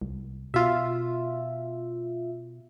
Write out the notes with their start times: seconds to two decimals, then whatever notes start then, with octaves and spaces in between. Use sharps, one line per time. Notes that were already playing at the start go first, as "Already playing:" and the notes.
0.01 C2
0.54 B2 F4 E5